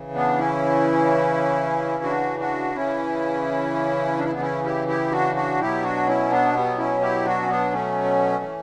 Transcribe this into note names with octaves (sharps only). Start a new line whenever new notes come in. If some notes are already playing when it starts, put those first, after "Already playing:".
Already playing: C#3 E3
B3 D4
C#4 E4
D4 F#4
D4 F#4
C#3 E3 C#4 E4
D4
E4
B3 D4
C#4 E4
E4 G4
E4 G4
D4 F#4
D4 F#4
B2 F#3 E4 G4
D4 F#4
C#4 E4
B3 D4
G3 B3
C#4 E4
E4 G4
D4 F#4
C#4
B3 D4
A3 C#4
E3